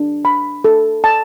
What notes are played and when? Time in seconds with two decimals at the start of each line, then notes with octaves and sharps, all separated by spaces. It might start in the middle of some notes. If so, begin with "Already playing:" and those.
Already playing: D4
0.25 B5
0.64 A4
1.04 A5